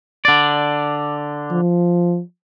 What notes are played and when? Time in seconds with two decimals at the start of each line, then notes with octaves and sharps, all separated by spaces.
0.25 D3 D5
1.51 F3